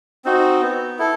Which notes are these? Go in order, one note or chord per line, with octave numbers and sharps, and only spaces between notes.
C4 D#4 F#4
B3
E4 A4